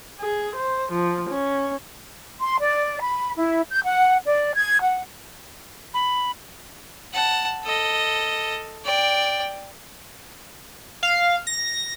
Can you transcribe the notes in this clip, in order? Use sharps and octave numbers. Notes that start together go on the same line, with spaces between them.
G#4
C5
F3
C#4
C6
D5
B5
E4
G6
F#5
D5
G#6
F#5
B5
F#5 A5
A4 D#5
D5 G5
F5
A#6